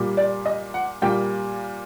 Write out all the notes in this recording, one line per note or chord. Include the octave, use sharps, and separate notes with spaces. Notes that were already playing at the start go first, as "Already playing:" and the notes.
Already playing: A#2 G3 A#3
D5
D#5
F#5
A#2 G3 A#3 G5